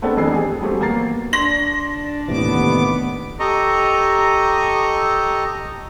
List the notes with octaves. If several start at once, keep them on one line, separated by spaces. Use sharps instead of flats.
A3 B3 C4 D4 A4
F1 F2 E3 D4 A4 C7
G4 G#4 G#5
F#3 G3 A3 C4 G4
E2 A#3 A#5 A6 C7
D4 C6 A#6 F#7
D#2 A2 C3 E3 B3 D6
G4 A4 D#5 A#5 C#6